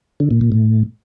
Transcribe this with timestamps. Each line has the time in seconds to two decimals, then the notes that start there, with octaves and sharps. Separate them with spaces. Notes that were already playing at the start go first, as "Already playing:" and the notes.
0.20 D3
0.31 A#2
0.41 A#2
0.52 A2